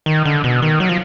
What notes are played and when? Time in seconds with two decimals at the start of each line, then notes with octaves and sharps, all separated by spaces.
0.06 D#3
0.25 D3
0.44 B2
0.62 D#3
0.80 F#3
0.89 F3